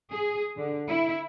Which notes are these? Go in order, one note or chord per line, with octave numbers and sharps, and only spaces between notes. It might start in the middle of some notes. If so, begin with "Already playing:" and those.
G#4
D3
E4